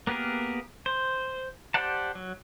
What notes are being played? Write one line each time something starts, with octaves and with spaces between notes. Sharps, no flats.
A#3 B3 G4 G#4 A#4
C5
G4 C5 D5 F#5 A5
F#3